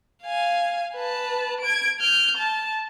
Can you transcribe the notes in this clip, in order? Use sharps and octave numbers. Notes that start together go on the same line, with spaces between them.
F5 G#5
B4 A5
G#6 D7
F6 G6
A5